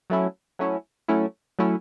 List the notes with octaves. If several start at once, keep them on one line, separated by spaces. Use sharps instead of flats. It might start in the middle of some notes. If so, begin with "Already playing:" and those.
F#3 A3 C#4 E4
F#3 A3 C#4 E4
F#3 A3 C#4 E4
F#3 A3 C#4 E4